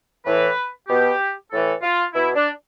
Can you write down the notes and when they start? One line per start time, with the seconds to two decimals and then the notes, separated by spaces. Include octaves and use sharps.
0.26 A2 E3 B4
0.88 B2 G4
1.51 A2 E3 A4
1.82 F4
2.14 B2 E4
2.35 D4